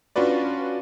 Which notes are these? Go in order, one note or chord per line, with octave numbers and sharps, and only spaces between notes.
C#4 D4 F4 F#4 B4 D5